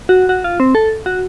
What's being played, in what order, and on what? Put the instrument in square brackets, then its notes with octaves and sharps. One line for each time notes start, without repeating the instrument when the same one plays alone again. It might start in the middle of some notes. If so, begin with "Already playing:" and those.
[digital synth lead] F#4
F#4
F4
C4
A4
F#4